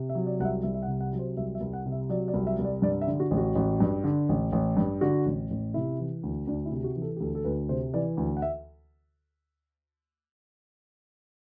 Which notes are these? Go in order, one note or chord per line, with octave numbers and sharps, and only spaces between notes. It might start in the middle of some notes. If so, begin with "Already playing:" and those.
Already playing: C3
E5
F#3
D5
C2 F#5
E5
C2 E5
E5
F#5
C3
F#5
F#3
C5
C2 E5
E5
C2
F#5
C3
E5
F#3 D5
D5
C2
E5
C2
D5
G2 D5
E5
D3
F#4
A1
F#4
A1
G2
D3
A1
A1
G2
D3 F#4
A1
A1
C3 E4
E3
D2
D2 D4
E4
C3
F#4
E3
A4
G4
D2 A4
A4
D2 B4
C3 C5
E3 D5
D2
F#5
E5